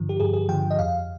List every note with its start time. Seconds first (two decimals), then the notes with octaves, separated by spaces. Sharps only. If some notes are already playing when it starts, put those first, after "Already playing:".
Already playing: G2 D3 F3
0.09 G4
0.20 G2 G#4
0.34 G#4
0.48 D3 F3 G5
0.71 D#5
0.79 F2 F5